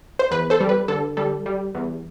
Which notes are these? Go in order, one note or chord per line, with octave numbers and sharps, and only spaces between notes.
C5
E2 B4
A4 C5
G3
B4
D3 A4
G3 A4
G3
E2